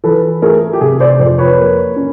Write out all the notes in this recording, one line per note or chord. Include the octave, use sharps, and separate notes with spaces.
E3 A4 B4
A3 G#4 A#4
G4
C3 G#4
C5 D5
F2 C5 D5
B4 C#5
A#3
C#4